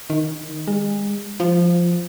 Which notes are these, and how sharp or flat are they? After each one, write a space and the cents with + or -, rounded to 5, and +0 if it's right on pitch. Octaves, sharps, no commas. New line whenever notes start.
D#3 -5
G#3 -35
F3 -5